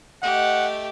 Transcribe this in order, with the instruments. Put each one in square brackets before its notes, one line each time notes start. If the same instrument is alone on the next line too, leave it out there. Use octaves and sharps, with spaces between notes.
[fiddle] A3 G4 [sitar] D#5 [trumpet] F#5